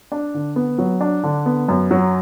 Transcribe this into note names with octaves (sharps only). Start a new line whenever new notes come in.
D4
D3
B3
F#3
D4
D3
B3
F#2
F#3